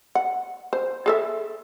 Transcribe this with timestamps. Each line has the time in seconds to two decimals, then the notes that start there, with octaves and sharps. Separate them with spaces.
0.15 F#5
0.73 C5
1.06 G#4 A4 E5